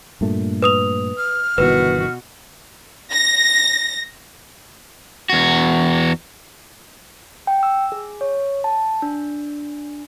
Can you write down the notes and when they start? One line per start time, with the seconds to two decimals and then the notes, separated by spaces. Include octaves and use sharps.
0.21 G2 A#2 A3
0.62 B4 D#6 F7
1.18 F6
1.58 G1 B2 D#3 E3 F#4 B4
3.12 A#6
5.29 E2 F#4
7.47 G5
7.63 E6
7.92 G#4
8.21 C#5
8.64 A5
9.02 D4